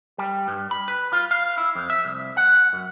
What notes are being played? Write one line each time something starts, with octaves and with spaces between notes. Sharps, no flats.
G3
G2
B5
B4
F4
F5
E4
F2
E5
C2
F#5
F#2